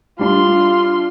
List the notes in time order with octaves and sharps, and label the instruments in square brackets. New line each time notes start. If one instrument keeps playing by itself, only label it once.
[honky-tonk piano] G3 D4 [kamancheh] F4 C6